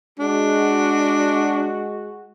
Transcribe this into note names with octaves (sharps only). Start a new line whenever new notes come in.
G#3 D4 F#4